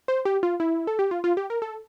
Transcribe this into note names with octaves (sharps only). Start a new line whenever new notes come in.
C5
G4
F4
E4
A4
G4
F4
F4
G4
A#4
A4